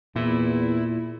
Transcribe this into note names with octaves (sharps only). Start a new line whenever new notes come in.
E2 A#2 E4